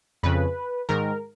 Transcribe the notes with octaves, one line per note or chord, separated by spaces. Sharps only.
F2 C#3 B4
G#2 D#3 A#4